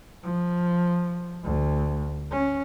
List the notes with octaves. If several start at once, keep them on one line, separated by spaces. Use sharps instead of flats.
F3
D2
C#4